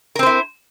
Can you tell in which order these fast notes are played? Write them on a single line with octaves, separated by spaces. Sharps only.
A#4 C4 C5 E4